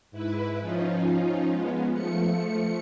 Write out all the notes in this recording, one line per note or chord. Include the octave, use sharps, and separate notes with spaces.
G#2 E4 B4
F3 C#4 D#4 F4
G#3 B3
F3 A3 C#7